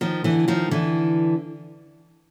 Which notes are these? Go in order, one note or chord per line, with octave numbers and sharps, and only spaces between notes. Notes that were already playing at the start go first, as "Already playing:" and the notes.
D#3 F3
D3 E3
D#3 F3
D3 E3